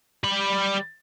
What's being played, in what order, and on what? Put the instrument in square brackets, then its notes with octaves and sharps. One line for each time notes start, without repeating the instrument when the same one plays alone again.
[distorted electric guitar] G3 B5